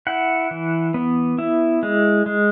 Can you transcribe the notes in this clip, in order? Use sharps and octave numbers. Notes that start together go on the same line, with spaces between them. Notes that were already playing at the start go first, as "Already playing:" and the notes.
E4 F#5
E3
B3
E4
G#3
G#3